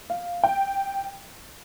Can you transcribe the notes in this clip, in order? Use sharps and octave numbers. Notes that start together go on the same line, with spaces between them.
F5
G5